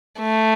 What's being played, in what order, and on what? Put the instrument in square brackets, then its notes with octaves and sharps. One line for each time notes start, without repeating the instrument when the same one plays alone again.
[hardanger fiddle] A3